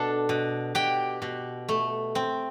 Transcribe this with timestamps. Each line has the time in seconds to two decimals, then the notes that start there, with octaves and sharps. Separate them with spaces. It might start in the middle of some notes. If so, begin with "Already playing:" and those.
Already playing: B2 D4 A4 A5
0.29 B2
0.75 B2 G4 G5
1.22 B2
1.69 A3
2.15 C4